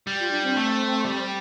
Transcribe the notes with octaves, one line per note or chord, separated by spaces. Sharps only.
G3
F4
D4
C4
A3
G3